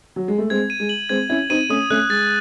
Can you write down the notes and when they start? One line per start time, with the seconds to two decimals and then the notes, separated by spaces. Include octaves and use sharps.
0.16 F#3
0.28 G#3
0.38 A3
0.50 G#3 C4 G#6
0.70 D#7
0.80 G#3
0.89 F#7
1.09 G#3 C4 G#6
1.29 C#4 E4 G#6
1.49 C4 D#4 D#7
1.69 A3 C#4 D#6
1.90 A3 C#4 F#6
2.09 G#3 A6